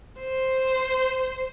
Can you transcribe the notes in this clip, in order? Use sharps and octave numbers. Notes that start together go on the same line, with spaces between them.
C5